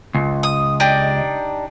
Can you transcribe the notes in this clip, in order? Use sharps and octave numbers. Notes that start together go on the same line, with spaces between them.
C#2
D#6
D4 D#4 G4